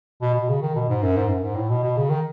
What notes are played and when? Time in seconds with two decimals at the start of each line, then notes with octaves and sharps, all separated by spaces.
0.22 B2
0.34 B2
0.48 C#3
0.62 D#3
0.75 B2
0.89 G#2
1.03 F#2
1.16 G#2
1.29 F#2
1.43 G#2
1.56 A2
1.69 B2
1.83 B2
1.97 C#3
2.10 D#3